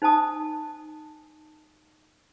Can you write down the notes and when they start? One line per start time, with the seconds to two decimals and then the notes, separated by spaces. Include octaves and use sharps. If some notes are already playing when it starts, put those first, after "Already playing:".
0.02 D#4 C5 G#5 A5 D#6